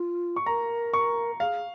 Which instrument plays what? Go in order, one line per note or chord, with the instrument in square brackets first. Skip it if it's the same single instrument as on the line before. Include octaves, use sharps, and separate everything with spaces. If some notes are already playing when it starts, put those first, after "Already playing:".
Already playing: [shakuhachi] F4
[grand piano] C#6
[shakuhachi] A#4 [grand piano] A#5
[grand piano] C#6
[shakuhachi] G#4 [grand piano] F5